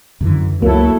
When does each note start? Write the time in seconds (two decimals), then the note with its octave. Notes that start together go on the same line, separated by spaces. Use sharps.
0.21 F#2 D3 E3
0.62 C#2 F#3 A#3 E4 A4